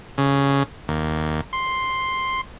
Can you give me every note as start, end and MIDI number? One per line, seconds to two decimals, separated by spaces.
0.18 0.63 49
0.88 1.41 39
1.53 2.41 84